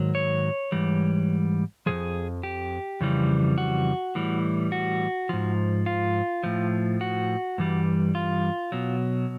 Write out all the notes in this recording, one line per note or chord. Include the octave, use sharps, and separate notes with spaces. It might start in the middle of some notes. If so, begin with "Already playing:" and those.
Already playing: G#2 D#3 F#3
C#5
G#2 E3 G3
F2 C#3 F3 G#4
G4
F2 C#3 E3 G3
F#4
A2 E3 G3
F#4
G#2 F3
F4
A2 F3
F#4
G2 E3 G3
F4
B2 F#3